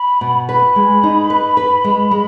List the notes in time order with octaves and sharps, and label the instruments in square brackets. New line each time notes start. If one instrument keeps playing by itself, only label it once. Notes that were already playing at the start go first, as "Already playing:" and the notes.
Already playing: [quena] B5
[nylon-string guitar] B2
[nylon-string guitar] B4 [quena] B5
[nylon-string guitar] G#3
D#4
B4
B4
G#3
G#3